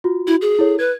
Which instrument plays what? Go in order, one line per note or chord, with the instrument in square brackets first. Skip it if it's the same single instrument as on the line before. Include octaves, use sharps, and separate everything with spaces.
[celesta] F4 F#4
[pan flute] E4 [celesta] F#4
[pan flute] G#4
[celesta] E4 A4 C#5
[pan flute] B4 [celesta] G#6